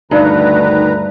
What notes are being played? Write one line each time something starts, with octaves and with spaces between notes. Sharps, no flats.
D2 G2 D#3 D#4 B4 A#5